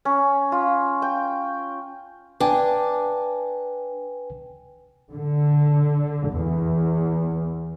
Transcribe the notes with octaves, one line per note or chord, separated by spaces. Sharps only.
C#4
F4
G5
D4 B4 G5 G#5
D3
E2